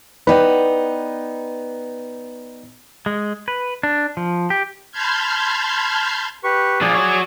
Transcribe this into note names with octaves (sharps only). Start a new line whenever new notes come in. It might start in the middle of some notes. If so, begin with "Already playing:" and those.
B3 D#4 B4 D5 G5
G#3
B4
D4
F3
G4
A5 B5 C6 F6 G6 G#6
G4 B4 C#6
F3 D4 G#4 D5
F#4 C#5